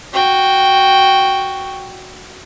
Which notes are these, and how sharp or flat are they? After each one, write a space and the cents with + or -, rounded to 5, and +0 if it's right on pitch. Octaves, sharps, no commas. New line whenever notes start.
F#4 +0 G5 +0